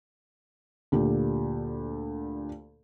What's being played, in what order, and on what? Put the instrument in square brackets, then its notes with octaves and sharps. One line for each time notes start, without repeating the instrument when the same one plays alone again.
[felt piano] D2 A#2 G4